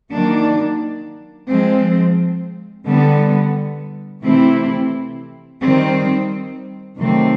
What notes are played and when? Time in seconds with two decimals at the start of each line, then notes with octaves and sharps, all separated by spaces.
0.12 D#3 F#3 A#3 D4
1.49 F3 G#3 C4
2.86 D3 G3 B3
4.24 C3 E3 A3 C4 E4
5.61 D#3 G3 C4
6.98 C3 D#3 F#3 A3 C4